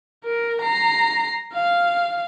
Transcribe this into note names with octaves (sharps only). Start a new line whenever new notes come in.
A#4
A#5 C7
F5